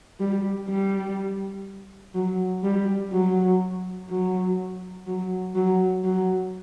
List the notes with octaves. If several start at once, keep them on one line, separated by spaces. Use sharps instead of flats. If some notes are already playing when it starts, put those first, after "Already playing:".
G3
G3
F#3
G3
F#3
F#3
F#3
F#3
F#3